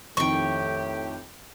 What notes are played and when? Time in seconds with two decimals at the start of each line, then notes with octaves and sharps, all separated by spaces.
0.17 F2 A2 D#3 G4 G5 C#6